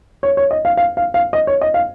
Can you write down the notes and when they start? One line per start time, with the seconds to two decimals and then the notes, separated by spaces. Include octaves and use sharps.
0.23 C#5
0.37 C#5
0.51 D#5
0.65 F5
0.77 F5
0.97 F5
1.14 F5
1.33 D#5
1.47 C#5
1.61 D#5
1.74 F5